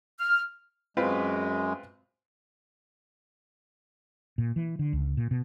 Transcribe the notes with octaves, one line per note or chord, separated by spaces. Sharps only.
F6
F#2 G#3 C4 F4 B4
A#2
E3
D3
C#2
A#2
B2